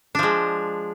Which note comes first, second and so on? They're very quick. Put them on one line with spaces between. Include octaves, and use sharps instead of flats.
D4 F3 G#3